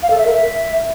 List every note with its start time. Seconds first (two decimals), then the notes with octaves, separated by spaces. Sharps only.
0.03 F5
0.10 A4
0.18 E5
0.26 A#4
0.33 E5